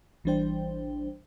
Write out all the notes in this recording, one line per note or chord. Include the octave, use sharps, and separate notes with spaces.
A1 E3 G3 D4 C5 G5